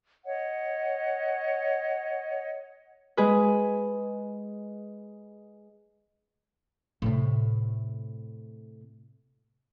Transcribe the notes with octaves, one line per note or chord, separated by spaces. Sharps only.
C#5 D#5 F#5
G#3 G#4 B4
A2 C3